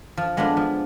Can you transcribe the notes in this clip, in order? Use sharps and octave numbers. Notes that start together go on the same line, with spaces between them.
F3
G#3 B3 D4 F4
F3